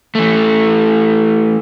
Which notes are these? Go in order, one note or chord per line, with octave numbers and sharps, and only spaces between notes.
E3 A3